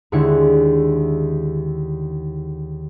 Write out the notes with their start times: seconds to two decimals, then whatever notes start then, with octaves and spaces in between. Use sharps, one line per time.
0.12 D#2 D3 G#3 E4 C#7